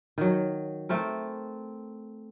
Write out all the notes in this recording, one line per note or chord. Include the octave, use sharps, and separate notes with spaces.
D#3 F#3
A3 C4 A#4